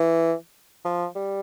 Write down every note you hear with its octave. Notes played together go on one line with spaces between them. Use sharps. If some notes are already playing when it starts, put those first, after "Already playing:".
Already playing: E3
F3
G3